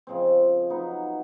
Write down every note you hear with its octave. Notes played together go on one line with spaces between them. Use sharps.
C#3 F3 G#3 C4
F#3 B3 D#4